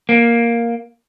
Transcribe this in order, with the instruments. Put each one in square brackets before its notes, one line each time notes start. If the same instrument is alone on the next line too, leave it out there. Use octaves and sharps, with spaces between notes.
[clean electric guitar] A#3